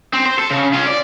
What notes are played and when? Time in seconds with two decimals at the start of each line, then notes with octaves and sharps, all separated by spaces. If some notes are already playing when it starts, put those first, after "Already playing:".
0.13 C4
0.26 C5
0.38 A4
0.51 C#3
0.74 C#4 F4
0.87 D5